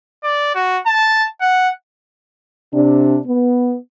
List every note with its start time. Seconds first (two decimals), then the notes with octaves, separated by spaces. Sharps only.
0.23 D5
0.55 F#4
0.86 A5
1.41 F#5
2.73 C3 D4
3.26 B3